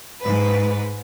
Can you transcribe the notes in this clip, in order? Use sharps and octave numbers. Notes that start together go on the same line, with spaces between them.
G#2 B4